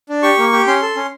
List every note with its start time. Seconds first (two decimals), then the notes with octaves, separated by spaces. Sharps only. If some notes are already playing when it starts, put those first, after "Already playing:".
0.09 D4
0.23 G4 C#6
0.38 A#3
0.53 G4
0.67 C#4 C6
0.82 A4
0.96 C#4